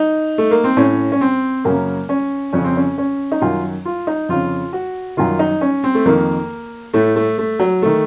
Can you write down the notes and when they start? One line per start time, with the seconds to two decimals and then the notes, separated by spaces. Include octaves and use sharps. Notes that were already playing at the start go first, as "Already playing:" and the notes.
Already playing: D#4
0.38 A3
0.51 A#3
0.64 C4
0.77 A2 C#4
1.12 C#4
1.21 C4
1.64 F#2 C#3 A#3
2.09 C#4
2.53 F2 C#3 C#4
2.64 C4
2.77 C#4
2.98 C#4
3.32 D#4
3.41 F#2 D#3 F4
3.85 F4
4.07 D#4
4.29 F2 C#3 F4
4.73 F#4
5.17 F#2 D#3 F4
5.39 D#4
5.61 C#4
5.84 C4
5.95 A3
6.05 F2 D#3 A#3
6.93 A2 A3
7.16 A3
7.38 A3
7.59 F#3
7.82 D#3 A3